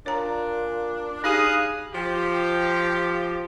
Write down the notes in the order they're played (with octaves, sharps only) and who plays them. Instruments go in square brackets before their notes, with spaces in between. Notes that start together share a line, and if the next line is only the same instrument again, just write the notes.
[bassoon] A#2 [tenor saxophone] D4 [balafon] C#5 A#5
[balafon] D#4 G4 [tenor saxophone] G#4 [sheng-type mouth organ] F5 D#6 F#6
[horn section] F3 G4